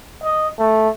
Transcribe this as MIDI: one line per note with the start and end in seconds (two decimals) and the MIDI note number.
0.23 0.49 75
0.59 0.89 57